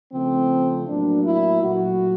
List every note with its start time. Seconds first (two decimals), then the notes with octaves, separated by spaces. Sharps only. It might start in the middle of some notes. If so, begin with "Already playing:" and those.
0.12 C#3 F3 A3 C4
0.87 A2 F#3 A#3 D4
1.25 E4
1.62 A#2 F#3 A3 F#4